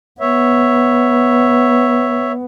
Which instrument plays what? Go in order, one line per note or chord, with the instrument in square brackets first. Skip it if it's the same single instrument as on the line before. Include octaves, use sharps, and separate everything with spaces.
[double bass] B3 [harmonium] C#5 E5